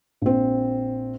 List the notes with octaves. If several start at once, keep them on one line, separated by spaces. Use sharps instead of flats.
A#1 C4